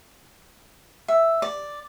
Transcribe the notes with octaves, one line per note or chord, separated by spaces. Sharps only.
E5
D5